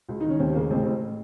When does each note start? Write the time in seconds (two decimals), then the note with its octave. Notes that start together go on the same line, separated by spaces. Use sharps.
0.09 C#2
0.21 D#3 D#4
0.30 C#4
0.40 D#2 C4
0.55 C#3 A#3
0.70 A1 C4
0.86 A2